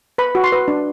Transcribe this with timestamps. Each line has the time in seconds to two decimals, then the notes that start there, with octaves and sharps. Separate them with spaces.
0.18 B4 B5
0.35 F#4
0.44 C6
0.52 B4
0.68 D4